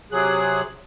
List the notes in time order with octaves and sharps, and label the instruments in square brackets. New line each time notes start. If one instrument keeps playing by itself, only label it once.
[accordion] C3 F#3 G#4 F#6